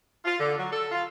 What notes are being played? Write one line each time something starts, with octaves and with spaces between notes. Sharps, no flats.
F4
D3
F#3
A4
F4